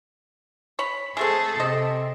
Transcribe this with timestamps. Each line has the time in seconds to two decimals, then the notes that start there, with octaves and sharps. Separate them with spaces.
0.79 C#5 B5
1.17 G#3 A3 C4 G#4 A4
1.60 C3 C5 D#5